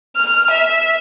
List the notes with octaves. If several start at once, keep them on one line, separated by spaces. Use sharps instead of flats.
F6
E5